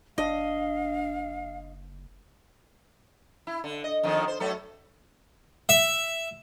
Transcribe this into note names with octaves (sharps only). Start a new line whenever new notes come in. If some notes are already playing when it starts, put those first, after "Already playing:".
F#1 D4 D#5 F5
E4
D3
D#5
F2 D3 D#3
C5
F#3 A3 A4
E5